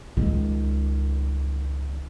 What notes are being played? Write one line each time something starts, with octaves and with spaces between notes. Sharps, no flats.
C#2 D#3